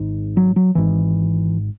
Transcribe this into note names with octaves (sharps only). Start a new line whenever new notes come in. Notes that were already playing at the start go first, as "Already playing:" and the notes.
Already playing: G#1 G#2
F#3
F#3
G#1 G#2 E3